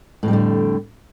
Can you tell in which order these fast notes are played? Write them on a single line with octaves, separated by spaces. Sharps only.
A2 F2 G3 E3 D3